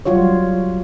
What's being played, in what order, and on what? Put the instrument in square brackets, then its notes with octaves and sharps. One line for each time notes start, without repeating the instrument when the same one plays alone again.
[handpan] F#3 G3 F4 F#4 C#5